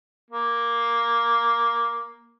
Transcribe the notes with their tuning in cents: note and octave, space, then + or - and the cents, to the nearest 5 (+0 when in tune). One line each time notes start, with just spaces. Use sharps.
A#3 +5